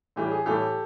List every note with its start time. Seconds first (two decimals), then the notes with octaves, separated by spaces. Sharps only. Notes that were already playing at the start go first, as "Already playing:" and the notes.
0.16 A2 E3 G3 G4
0.31 G#4
0.46 A2 E3 G3 G4 A4